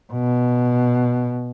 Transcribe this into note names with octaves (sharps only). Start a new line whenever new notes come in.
B2